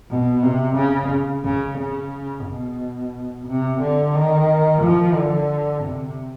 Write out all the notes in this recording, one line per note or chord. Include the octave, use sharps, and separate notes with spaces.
B2
C3
C#3
C#3
C#3
B2
C3
D3
D#3
F3
D3
C3